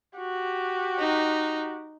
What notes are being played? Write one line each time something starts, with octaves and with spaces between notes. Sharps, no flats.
F#4 G4
D#4